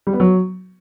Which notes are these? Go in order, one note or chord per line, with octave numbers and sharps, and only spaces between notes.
G3
B3
F#3